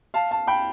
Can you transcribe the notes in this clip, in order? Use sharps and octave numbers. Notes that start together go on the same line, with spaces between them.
F5 A5
F5 A5
G5 B5